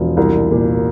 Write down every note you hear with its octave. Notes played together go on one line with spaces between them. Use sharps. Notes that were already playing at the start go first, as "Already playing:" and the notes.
Already playing: E1 F3
C2
A#2